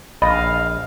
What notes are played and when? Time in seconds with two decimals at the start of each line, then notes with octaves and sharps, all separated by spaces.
0.22 A#1 D#5 F5 B5